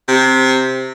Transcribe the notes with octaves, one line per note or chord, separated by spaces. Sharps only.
C3